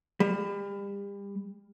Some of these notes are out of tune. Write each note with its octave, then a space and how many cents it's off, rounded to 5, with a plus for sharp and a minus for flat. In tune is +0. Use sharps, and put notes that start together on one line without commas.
G3 +35